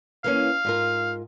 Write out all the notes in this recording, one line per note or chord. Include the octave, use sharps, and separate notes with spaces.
E3 A#3 C#4 F5
G#2 F4 A#4